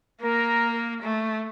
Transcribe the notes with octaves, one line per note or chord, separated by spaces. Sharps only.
A#3 A#4
A3